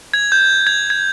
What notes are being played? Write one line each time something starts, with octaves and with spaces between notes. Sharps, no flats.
G#6
G6
G#6
G#6